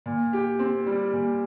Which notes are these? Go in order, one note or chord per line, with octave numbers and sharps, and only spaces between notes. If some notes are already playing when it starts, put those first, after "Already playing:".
A#2
G4
C4
G3
A#2